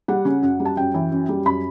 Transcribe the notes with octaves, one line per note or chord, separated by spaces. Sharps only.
G3 F#5
C#3
F#2
G3
A5
F#2 G5
E3
F#2
G3
F#2 B5